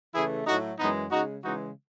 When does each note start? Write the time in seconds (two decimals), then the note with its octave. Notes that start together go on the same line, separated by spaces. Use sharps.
0.14 C#3 E3 A3 E4 G#4
0.46 A2 F#3 A3 D#4 F#4
0.78 F#2 E3 G#3 B3 D#4
1.11 C#3 G#3 D#4 F#4
1.43 C#3 E3 G#3 D#4 F#4